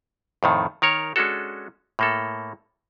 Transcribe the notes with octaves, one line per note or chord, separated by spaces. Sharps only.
F2 A2 D#3
D#3 A#4 C#5
G#3 C#4 D4 F#4 A4
A2 A#3 A4